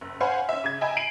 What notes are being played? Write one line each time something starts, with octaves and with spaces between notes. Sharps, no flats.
F#1
C5 C#5 F5 F#5 G#5 B5
C#4 E5
C#3 G#6
D#5 E5 G5 G#5 A#5 B5
C7 D7 D#7 F#7